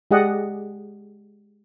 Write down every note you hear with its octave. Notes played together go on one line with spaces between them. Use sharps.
G#3 G4 G#4 D5 D#5 F#5